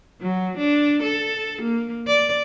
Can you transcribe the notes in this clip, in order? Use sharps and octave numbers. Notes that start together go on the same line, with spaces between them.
F#3
D4
A4
A#3
D5